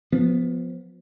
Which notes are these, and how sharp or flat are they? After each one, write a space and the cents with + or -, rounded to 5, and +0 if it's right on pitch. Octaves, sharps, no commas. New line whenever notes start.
F3 +20 B3 +0